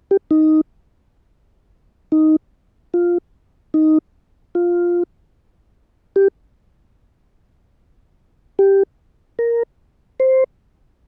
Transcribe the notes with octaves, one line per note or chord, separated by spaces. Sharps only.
G4
D#4
D#4
F4
D#4
F4
G4
G4
A#4
C5